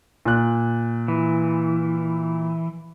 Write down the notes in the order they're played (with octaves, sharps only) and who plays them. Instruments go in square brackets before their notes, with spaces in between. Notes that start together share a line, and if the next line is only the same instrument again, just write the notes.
[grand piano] A#2 F#6
[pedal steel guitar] E3